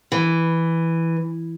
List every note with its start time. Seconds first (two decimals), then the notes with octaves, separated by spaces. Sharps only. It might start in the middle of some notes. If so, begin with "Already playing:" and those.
0.12 E3